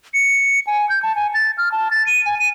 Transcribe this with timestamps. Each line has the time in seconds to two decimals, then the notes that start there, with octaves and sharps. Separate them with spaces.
0.14 C#7
0.67 G#5
0.89 G6
1.03 A5
1.16 G#5
1.34 A6
1.58 F6
1.72 A5
1.91 A6
2.07 D#7
2.26 G#5
2.39 D#7